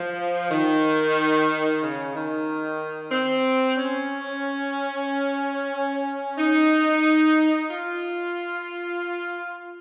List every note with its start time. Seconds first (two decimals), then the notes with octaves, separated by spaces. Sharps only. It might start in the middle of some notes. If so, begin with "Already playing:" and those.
Already playing: F3
0.51 D#3
1.82 C#3
2.14 D#3
3.11 C4
3.77 C#4
6.38 D#4
7.68 F4